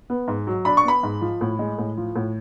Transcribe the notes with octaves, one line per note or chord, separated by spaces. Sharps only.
B3
G#2
F#3
D4 B5
C#6
B3 B5
G#2
F3
A2
G#3
A2
F3
A2